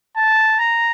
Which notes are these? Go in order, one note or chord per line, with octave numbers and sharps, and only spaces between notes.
A5
A#5